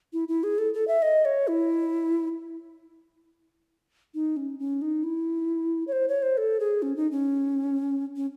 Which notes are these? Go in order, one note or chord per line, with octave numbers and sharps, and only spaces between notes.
E4
E4
G#4
A4
A4
E5
D#5
C#5
E4
D#4
C#4
C#4
D#4
E4
C#5
C5
C#5
C5
A4
G#4
C#4
D#4
C#4
C#4